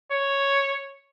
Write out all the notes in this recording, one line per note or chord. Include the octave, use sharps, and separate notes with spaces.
C#5